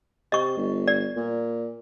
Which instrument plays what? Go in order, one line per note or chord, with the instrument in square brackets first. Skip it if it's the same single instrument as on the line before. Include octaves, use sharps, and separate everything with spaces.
[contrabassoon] C3 [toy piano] D#5 C#6
[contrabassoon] G1
[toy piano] D5
[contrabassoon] A#2